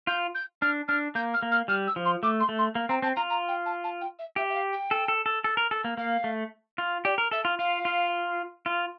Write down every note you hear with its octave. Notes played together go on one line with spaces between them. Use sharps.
F4 G6
G6
D4 F6
D4 F6
A#3 G6
F6
A#3
F6
G3 F6
E6
F3
C6
A3 D6
C6
A3
C6
A#3
C4 A#5
C4 A5
F4 A#5
A#5
G5
A5
A5
G5
E5
G4 E5
E5
F5
G5
A4
A4
A4
A4
A#4
A4
A#3
A#3 F5
A3
F4
G4 D5
A#4
A4 E5
F4
F4 F5
F4
F4